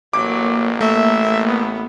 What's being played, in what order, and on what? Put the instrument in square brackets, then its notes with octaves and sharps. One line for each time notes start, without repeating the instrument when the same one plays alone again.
[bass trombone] A1 [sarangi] F#3 [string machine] A#3 [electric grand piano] D6
[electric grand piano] A3 [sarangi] E5
[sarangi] B3